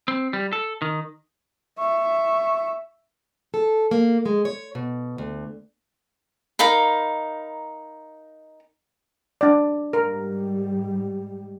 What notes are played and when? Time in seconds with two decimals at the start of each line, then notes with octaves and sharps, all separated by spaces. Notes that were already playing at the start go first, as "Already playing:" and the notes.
0.08 C4
0.33 G3
0.53 A4
0.82 D#3
1.79 E5 C#6
3.54 A4
3.91 A#3
4.26 G#3
4.45 C#5
4.75 B2
5.18 D2
6.59 D#4 A#4 F5 B5
9.41 D4 D5
9.93 G#2 G3 A#4